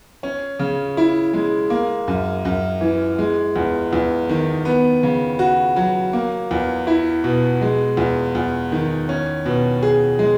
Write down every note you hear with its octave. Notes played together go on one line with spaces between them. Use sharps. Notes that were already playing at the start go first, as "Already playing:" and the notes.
C#4
C#3
E4
G#3
A#3
F#2
F#2
E3
G#3
E2
E2
D#3
B3
C#3
F#4
F#3
A#3
E2
E4
B2
G#3
E2
E2
D#3
C#4
B2
G#4
G#3